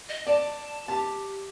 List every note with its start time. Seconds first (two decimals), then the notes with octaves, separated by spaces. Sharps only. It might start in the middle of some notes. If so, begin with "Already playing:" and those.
0.09 D#5
0.27 D5 A5
0.88 G4 A5